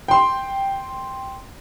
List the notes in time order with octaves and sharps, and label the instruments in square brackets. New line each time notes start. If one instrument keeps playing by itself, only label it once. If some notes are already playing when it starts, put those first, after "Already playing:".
[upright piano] G5 C6